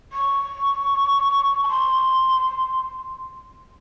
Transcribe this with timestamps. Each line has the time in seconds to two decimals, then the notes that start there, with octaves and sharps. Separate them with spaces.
0.13 C#6
1.64 A5
1.69 C6